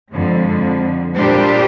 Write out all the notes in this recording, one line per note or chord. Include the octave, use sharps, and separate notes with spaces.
F2 D3 G#3
A#2 G3 D4 G4 C5